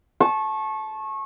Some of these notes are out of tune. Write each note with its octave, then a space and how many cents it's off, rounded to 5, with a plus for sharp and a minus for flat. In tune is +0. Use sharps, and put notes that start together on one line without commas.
A5 -20 C#6 -25